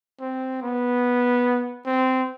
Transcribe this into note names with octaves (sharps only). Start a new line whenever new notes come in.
C4
B3
C4